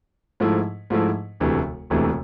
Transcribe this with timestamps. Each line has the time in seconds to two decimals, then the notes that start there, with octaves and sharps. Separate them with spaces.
0.40 G#2 F3 A3 E4
0.90 G#2 F3 A3 E4
1.40 E1 D2 C3 E3 A3
1.90 E1 D2 C3 E3 A3